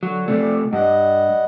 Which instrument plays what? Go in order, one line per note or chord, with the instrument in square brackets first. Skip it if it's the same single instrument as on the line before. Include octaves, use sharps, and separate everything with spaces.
[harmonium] D3 [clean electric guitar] F#3
[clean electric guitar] C3 A3 [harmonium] D5
[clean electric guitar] G2 [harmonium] G3 D#5 F#5